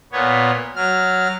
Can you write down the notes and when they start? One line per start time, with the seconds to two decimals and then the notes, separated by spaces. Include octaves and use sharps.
0.12 A#2 B3 C#5
0.76 F#3 F6